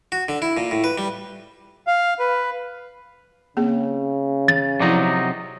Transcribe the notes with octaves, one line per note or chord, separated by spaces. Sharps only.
F#4
D3
E4
A#2
A2
B4
G3
F5
B4
C#3 A#3 C4 G#4
A6
C3 F3 F#3 D#4 E4